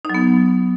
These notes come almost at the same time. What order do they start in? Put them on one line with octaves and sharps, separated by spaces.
D#4 F#3 B3